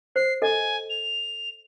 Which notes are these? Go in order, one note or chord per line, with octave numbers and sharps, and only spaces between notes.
C5 C7
A4 D#5 G#5
F7